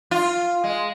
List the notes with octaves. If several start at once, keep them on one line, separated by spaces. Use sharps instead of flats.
F4
G#3